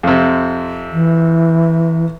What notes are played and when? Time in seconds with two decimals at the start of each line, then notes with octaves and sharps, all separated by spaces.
0.03 F2 C3
0.93 E3